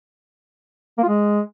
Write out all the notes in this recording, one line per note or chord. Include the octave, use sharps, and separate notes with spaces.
A#3
F4
G#3